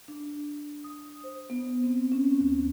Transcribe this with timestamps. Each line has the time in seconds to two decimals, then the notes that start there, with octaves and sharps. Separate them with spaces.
0.08 D4
0.84 D#6
1.24 C5
1.50 B3
1.84 C4
2.12 C#4
2.41 D#2